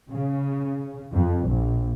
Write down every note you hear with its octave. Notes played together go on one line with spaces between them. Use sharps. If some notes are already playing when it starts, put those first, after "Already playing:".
C#3
F2
A#1